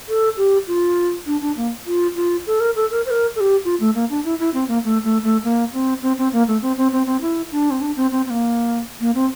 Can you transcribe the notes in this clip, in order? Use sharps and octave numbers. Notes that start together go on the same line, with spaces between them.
A4
G4
F4
D4
D4
A#3
F4
F4
A4
A#4
A4
A#4
C5
A#4
A4
G4
F4
A3
A#3
D4
E4
E4
C4
A#3
A3
A3
A3
A#3
C4
C4
C4
A#3
A3
C4
C4
C4
C4
E4
D4
C4
D4
C4
C4
C4
A#3
A#3
C4